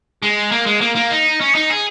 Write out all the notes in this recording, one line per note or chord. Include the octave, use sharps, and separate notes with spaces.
G#3
A#3
G#3
A#3
A#3
D#4
C#4
D#4
G#4